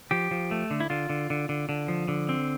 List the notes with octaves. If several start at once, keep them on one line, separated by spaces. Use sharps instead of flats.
F3 G4
F3
A3
D3
E4
D3 F4
D3
D3
D3
D3
F3
D3
C4